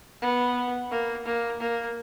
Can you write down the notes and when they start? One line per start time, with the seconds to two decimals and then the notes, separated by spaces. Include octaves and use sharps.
0.21 B3
0.91 A#3
1.25 A#3
1.60 A#3